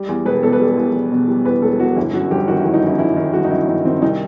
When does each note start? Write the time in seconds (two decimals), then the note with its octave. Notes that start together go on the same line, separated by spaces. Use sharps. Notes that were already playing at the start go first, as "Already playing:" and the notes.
Already playing: G3
0.08 E2
0.25 E1 B4
0.43 B2 A4
0.53 B4
0.60 G3 A4
0.77 E2
0.94 E1
1.12 B2
1.28 G3
1.45 E2 B4
1.62 E1 A4
1.79 B2 F#4
1.96 G1 E4
2.13 F#2 F#4
2.31 G1 G4
2.48 D#3 F#4
2.61 E4
2.65 G1
2.74 D#4
2.83 F#2 E4
2.99 G1 E4
3.16 D#3
3.33 G1 F#4
3.44 D#4
3.51 F#2 E4
3.68 G1 D#4
3.85 D#3 C4
4.02 C2 D#4